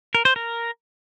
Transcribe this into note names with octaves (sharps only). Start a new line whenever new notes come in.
A#4
C5
A#4